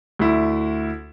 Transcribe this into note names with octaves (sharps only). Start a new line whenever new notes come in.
D2 E4